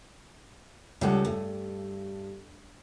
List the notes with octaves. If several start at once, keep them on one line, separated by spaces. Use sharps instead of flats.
C#2 G3 A3 A4 F#5
G2 A3